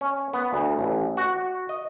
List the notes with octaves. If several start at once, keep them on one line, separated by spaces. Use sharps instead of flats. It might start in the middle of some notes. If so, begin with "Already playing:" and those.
C#4
B3
D2
A1
F#4
D#5